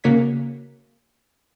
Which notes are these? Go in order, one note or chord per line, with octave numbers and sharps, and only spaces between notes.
C#3 A#3 F#4 C#5 G#5 B6